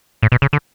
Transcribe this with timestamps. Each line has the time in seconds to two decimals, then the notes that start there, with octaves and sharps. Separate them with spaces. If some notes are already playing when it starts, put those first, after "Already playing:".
0.23 A2
0.32 B2
0.42 C#3
0.53 D3